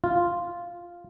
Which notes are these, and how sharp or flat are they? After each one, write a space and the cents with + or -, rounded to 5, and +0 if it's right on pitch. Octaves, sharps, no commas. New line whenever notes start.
F4 -5